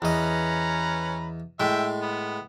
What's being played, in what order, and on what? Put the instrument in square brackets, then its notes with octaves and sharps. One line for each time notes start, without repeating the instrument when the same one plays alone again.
[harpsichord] E2 D#5 [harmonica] C#4 B4 A#5
[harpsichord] A2 G#3 [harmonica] E5 G5
[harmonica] B3